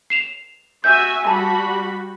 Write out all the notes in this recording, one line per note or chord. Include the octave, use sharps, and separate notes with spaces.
C7 E7 F7
F#4 E5 G#5 G6
G3 F#4 A5 B5